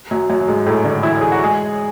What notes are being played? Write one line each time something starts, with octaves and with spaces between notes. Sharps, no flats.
F#2 F#3
F#2 F#3
F#3
G#2 G#3
A2 A3
D3 D4
E3 E4
G#4
F#4
G#3 G#4